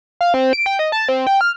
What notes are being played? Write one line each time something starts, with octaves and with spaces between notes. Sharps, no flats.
F5
C4
D7
G5
D#5
A5
C4
G5
F6